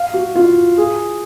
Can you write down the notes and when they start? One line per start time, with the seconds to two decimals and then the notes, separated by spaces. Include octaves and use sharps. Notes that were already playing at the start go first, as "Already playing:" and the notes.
Already playing: F5
0.14 F#4
0.35 F4
0.78 G#4